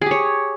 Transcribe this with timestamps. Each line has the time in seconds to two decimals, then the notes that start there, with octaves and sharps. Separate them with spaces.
0.02 G#4
0.06 G4
0.11 C#5